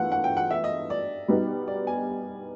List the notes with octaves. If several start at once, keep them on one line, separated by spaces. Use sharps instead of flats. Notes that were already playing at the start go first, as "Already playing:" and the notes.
Already playing: E3 A3 F4 F#5
F#5
G5
F#5
E5
D#5
D5
B2 G3 B3 D#4
D5
G#5